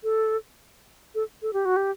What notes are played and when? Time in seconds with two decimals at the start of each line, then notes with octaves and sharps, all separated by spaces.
0.04 A4
1.15 A4
1.42 A4
1.53 G4
1.65 F#4
1.76 G4